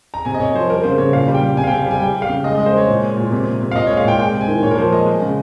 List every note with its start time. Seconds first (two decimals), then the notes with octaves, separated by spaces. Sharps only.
0.14 A#5
0.25 C3 G#5
0.34 D#5
0.40 C3 C#5
0.54 F3 C5
0.70 G3 A#4
0.83 C#3 C5
0.98 C#3 C#5
1.13 A#2 F5
1.28 G3
1.34 G5
1.43 G3
1.57 C3 G#5
1.64 F5
1.67 G5
1.71 C3
1.79 F5
1.86 G3 G#5
2.00 G3 G5
2.16 G3
2.22 F5
2.29 C#3
2.44 G#3 D#5
2.55 D#5
2.59 G#3
2.66 C5
2.74 G#3 C#5
2.88 A#2
3.03 G#3
3.17 A#2
3.32 C3
3.46 C3
3.62 C3
3.72 F5
3.75 A#2 D#5
3.87 C#5
3.91 G#3
3.97 F5
4.05 A#2 G5
4.19 G#3 G5
4.33 C3
4.41 G#5
4.48 D#3
4.63 A#2 C#5
4.71 A#4
4.78 F3 C5
4.92 G#3 D#5
5.06 G#3
5.22 C#3